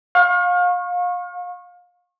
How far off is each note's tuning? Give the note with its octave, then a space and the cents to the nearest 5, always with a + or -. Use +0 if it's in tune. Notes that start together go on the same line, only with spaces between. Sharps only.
F5 +30 C#6 -30